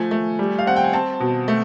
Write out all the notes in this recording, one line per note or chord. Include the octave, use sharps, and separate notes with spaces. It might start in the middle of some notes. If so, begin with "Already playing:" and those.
Already playing: F3 A3 G#5
A3
G3
F5
C4 F#5
G5
G#5
C4 A5
B2
A3